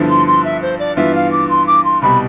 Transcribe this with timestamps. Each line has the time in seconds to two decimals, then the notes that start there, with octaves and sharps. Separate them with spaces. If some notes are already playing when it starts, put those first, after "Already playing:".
Already playing: G2 D3 F3 B3 E4
0.09 C6
0.27 C6
0.44 E5
0.62 C5
0.79 D5
0.97 G2 E3 B3 F4 E5
1.15 F5
1.32 D6
1.49 C6
1.67 D6
1.85 C6
2.02 C2 B2 G3 B5